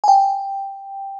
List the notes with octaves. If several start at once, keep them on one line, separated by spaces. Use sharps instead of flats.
G#5
G5